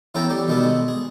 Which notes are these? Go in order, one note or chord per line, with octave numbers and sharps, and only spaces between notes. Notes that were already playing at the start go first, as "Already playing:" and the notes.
E3 B3 C#4 A4 G5 A#5
G3 G4
B2 D#3 G3 B3 A4
G#3
G#4